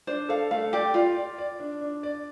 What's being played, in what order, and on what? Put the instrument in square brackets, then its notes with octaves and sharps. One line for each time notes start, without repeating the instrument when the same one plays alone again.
[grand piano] D4 [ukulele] C5
[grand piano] A4 [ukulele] F5
[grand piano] A3 [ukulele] F5
[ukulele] G4 [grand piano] D5
[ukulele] F4 [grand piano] D5
[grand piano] D5
D5
D4
D4
D5